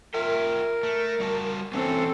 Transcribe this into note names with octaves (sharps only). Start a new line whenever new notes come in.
F4 A#4 E5 G5
A3
G3 F#4 A5
E3 F#3 C4 C#4 A4